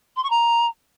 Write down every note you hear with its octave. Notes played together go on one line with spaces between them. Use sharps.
C6
C#6
A#5